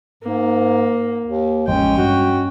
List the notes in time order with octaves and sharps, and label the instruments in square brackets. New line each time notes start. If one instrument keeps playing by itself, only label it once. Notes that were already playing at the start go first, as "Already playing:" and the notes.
[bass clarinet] G#2 [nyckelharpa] A#3
[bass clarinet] D#2
[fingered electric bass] A1 F2 [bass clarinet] G#3 [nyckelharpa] C#4 G5
[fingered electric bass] G2 [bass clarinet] F#4